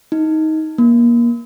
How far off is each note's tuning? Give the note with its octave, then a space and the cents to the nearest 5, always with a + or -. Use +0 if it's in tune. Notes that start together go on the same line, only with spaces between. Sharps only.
D#4 +15
A#3 +25